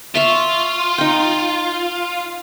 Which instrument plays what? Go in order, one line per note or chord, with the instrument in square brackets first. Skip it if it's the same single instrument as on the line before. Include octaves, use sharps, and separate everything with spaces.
[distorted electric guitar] F4 [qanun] E5 C#6
[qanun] D#4 G5